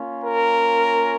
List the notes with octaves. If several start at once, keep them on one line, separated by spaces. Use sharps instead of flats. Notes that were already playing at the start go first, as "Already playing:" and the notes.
Already playing: A#3 C#4 F4
A#4